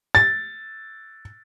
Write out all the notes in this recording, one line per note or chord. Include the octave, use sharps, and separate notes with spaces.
A6